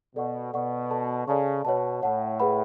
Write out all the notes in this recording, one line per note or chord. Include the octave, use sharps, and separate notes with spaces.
B2 A4 D5 F#5 C#6
B2 A4 D5 F#5 C#6
A4 D5 A5 C#6
C#3 A4 D5 A5 C#6
B2 C#5 F#5 A5
A2 C#5 F#5 A5
G#4 B4 F#5 B5